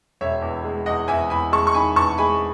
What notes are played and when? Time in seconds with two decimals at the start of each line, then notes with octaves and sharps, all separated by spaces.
0.21 E1 C#5 E5
0.42 E2
0.64 G#3
0.86 E2 D#5 F#5
1.08 E2 E5 G#5
1.30 E2 G#5 B5
1.52 G#3 A5 C#6
1.67 C#6
1.74 D#3 G#5 B5
1.96 E2 A5 C#6
2.18 G#3 G#5 B5